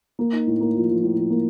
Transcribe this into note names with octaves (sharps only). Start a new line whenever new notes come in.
A#3
D#4
A2
A#3
F3
F3
A2
F3
A#3